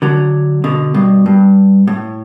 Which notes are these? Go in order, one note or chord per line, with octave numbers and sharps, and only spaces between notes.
D3 F#3
B2 D3
G2 B2
G2
A2